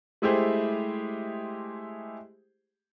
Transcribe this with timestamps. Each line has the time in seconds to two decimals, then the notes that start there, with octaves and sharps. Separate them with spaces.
0.22 G#3 A3 E4 G4 G#4 C5